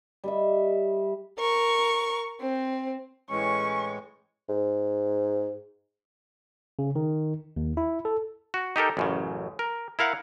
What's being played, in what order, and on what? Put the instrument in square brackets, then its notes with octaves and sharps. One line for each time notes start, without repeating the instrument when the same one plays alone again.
[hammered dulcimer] G3 D#5 E5
[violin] A#4 C#6
C4
[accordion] A2 E3 G#3 [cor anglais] C#4 [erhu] C#6
[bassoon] G#2
[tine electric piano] C#3
D#3
D#2
E4
A4
[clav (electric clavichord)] F#4
D#4 G4 A4 A#4
A1 F#2 C#3
A#4
E4 A#4 F5 F#5